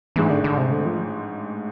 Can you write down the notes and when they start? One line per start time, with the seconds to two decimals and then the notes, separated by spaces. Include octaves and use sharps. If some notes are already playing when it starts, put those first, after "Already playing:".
0.16 A1 G#2 E3 G#3 D4
0.30 D3
0.44 D3
0.58 C3
0.72 D3
0.86 F3